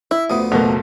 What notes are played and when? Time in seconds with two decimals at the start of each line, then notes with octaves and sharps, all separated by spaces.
0.11 E4 E5
0.30 D2 F3 B3 D#6
0.52 F#1 B2 F#3 A3 A#3